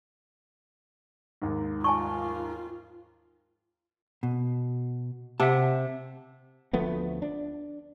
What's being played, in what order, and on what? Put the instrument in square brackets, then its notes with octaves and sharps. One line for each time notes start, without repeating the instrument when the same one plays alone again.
[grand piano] D#2 G#2
[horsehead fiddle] F4 [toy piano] G#5 A5 C#6
[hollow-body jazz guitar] B2
[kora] C3 [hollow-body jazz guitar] E5 F#5 A5
[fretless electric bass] D2 F3 A3 B3
D4